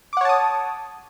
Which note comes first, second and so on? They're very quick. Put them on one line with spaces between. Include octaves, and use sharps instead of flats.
D6 F#5 C#5 A5 D#6